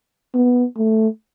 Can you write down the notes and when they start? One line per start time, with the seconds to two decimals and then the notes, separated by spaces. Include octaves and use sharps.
0.34 B3
0.77 A3